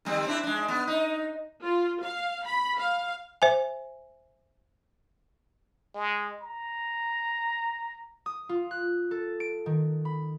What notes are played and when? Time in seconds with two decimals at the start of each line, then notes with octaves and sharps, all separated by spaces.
0.05 D#3 G3 C4
0.27 C4 D4 E4
0.44 G#3 D4
0.68 B3
0.87 D#4
1.64 F4
2.02 F5
2.46 B5
2.78 F5
3.42 C5 E5 G#5
5.95 G#3
6.41 A#5
8.26 D#6
8.49 F4
8.71 F#6
9.11 A4
9.40 D7
9.66 D#3
10.05 B5